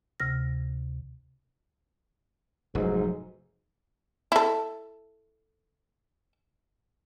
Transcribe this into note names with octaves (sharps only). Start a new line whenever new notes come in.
D2 C3 F6 A#6
F1 G#2 F#3 D#4
E4 A4